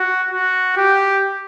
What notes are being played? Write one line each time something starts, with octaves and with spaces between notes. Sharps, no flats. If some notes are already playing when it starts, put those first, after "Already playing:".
Already playing: F#4
F#4
G4